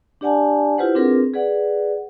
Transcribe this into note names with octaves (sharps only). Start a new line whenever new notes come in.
D4 G4 D5 F#5 G#5 A5
E4 F4 G4 B4 C5 F#5
C4 D4 F4 G#4 A#4 B4
G#4 B4 D5 F#5